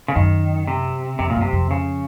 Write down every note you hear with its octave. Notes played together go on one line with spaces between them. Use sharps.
C#3
F#2 D#3
C3
F2 C3
A#2
F#2 C3
F2
C#3